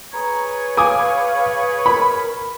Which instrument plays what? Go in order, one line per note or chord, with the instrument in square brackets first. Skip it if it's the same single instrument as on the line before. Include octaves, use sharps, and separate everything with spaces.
[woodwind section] G#4 B4 C#5 [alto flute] A#5
[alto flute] F5 [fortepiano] G#5 D6 D#6
[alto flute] A#4 [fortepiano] B5